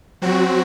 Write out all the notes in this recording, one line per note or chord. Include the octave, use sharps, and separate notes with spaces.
F#3 C4 F#4